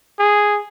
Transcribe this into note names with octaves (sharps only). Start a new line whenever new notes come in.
G#4